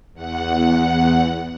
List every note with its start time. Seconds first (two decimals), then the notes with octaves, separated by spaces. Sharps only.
0.13 E2 F#5